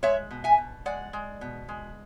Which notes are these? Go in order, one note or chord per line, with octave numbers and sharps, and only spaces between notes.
G#3 C#5 E5
B2
E5 G#5
B2
G#3 D5 F#5
G#3
B2
G#3